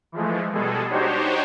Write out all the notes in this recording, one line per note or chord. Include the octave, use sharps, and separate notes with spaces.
E3 F3 G#3 A3
B2 G3 G#3 G#4 A4
D4 D#4 F#4 G4 C5 C#5